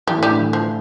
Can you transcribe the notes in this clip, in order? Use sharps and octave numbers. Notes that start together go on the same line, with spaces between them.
E3 G3
A2
G3
D3
E3
F3